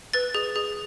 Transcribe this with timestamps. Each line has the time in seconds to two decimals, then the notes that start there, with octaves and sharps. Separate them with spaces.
0.13 B4 A6
0.35 G#4
0.56 G#4